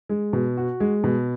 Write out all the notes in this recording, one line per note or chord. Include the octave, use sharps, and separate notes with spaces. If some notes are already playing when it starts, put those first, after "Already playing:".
G#3
B2
F#4
G#3
B2